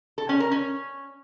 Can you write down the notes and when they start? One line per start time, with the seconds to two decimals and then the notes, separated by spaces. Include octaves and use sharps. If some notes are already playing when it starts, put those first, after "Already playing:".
0.18 A4
0.29 C#4
0.40 A#4
0.51 C#4